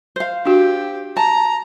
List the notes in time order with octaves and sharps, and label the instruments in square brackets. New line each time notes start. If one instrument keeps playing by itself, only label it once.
[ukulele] C5 F5
[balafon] D4 F#4 [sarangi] G4
[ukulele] A5 [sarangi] A#5